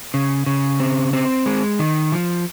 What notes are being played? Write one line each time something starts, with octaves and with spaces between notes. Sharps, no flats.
C#3
C#3
C4
C4
G#3
D#3
F3